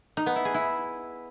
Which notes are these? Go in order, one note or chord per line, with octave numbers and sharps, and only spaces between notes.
D#4
B3
E4
G#4
E4